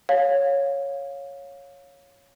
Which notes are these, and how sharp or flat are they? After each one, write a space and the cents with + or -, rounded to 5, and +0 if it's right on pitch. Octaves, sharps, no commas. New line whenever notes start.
C#5 +0 F5 +15